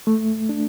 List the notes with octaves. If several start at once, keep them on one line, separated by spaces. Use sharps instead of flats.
A3
D4